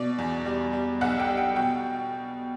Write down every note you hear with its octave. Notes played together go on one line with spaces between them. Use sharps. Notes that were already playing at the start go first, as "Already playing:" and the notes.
Already playing: B2 D5
E2
G3
G3
B1 F#5
G5
G3
G5
B2 G5